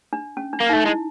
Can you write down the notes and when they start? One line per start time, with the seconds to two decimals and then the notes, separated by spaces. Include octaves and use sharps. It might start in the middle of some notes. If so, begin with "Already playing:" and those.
0.13 D4
0.37 C#4
0.53 D4
0.60 A#3
0.69 A3 D#4
0.86 G#3 E4